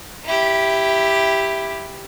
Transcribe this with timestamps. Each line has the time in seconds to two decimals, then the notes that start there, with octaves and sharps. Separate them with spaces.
0.25 E4 G4